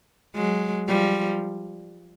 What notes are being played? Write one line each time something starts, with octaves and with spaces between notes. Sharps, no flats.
F#3 G#3
F3 G3